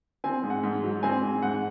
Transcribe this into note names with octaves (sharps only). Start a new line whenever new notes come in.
C4 G#5
G#2
F#5
G#2
F#3
C4 G#5
G#2
G#2 F#5